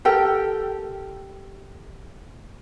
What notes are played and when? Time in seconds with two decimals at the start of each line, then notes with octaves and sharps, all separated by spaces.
0.05 G4 A4 A#4 G5